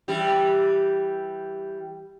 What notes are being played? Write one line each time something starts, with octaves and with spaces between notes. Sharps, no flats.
E3 G3 G4